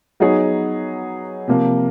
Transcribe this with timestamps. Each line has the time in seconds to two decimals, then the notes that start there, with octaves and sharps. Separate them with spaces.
0.20 F#3 B3 D#4 G#4 C#5
1.48 C3 F3 A#3